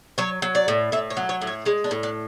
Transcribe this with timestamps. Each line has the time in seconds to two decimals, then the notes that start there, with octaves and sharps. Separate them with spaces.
0.18 F#3 C#5
0.42 F#3
0.55 D5
0.68 A2
0.92 A2 E5
1.10 C#5
1.17 F#3
1.29 C#5
1.41 A2
1.47 C#5
1.65 G#3 C#5
1.84 D4
1.91 A2
2.03 D4